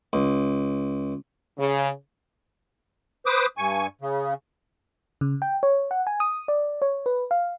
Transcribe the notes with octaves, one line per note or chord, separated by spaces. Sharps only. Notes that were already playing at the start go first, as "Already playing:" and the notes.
C#2
C#3
B4 C5 D6 D#6
G2 G#5 C#6
C#3
C#3
G5
C#5
F#5
G#5
D#6
D5
C#5
B4
F5